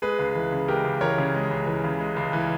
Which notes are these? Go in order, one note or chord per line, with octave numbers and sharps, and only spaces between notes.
G#3 G#4 B4
C#2
E3
C#3
G#3 G4 A#4
C#2
E3 A#4 C#5
C#3
G#3
C#2
E3
C#3
G#3
C#2
E3